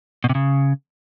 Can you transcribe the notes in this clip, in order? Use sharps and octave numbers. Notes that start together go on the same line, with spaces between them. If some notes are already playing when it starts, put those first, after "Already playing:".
B2
C3
C#3